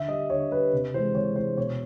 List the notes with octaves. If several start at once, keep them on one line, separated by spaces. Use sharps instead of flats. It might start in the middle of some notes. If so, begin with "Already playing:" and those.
Already playing: D3 E5
G3 D#5
D3 C#5
G3 B4
C3
E3 G#3 C5
C3 C#5
E3 G#3 C5
B2 C#5